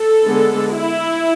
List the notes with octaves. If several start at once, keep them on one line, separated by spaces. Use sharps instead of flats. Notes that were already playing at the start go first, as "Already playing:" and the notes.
Already playing: A4
D3 G#3 B3
E4